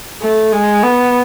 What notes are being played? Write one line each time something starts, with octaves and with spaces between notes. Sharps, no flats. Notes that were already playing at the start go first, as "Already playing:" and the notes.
A3
G#3
B3